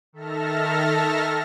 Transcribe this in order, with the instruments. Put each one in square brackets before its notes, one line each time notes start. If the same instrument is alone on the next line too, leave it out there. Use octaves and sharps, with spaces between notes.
[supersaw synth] D#3 A4 E5 A5 F6 A#6